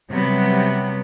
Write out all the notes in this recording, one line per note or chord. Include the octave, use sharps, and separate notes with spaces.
C3 F#3 G3 B3